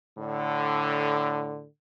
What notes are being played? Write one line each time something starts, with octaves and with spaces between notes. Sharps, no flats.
A2 D3